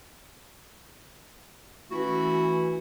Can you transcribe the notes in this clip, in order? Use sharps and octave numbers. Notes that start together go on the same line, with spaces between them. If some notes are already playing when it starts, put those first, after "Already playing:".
E3 A3 C#4 E4 F#4